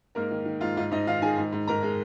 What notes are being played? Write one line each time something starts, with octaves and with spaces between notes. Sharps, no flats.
G#2 A#3 A#4
D#3
D#3
G#2 F4
G#2 F4
G#2 D#4 D#5
D#3 F4 F5
D#3 G#4 G#5
G#2
G#2
G#2 A#4 A#5
G#3